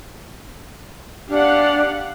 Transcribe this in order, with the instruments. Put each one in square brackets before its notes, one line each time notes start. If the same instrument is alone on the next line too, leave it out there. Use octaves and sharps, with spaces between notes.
[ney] D4 [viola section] G4 F5 F#5